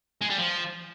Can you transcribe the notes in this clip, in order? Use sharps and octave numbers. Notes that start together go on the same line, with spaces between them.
G#3
G3
F3